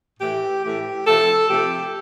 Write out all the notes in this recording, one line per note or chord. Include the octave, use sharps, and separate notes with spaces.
A2 E3 A3 G4
A2 E3 A3 G4
C3 F3 A3 A4
C3 F3 A3 G4